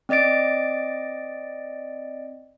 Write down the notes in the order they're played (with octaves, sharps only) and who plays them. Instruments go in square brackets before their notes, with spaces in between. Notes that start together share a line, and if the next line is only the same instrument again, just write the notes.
[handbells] C4 D5 D#5 A6 D7